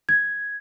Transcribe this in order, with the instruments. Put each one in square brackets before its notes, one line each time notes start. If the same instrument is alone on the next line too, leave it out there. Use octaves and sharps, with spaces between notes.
[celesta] G#6